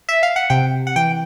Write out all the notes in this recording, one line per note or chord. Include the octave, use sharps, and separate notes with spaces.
E5
F5
F#5
C3 G5
F#5
E3 G5